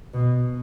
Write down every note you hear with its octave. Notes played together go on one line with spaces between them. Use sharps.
B2